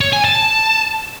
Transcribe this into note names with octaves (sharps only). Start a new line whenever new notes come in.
C#5
G#5
A5